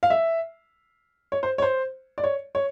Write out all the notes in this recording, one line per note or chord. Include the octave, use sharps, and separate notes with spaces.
F5
E5
C#5
C5
C#5
C5
D5
C#5
C#5